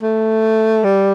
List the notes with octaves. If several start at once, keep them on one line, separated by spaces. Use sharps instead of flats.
A3
G3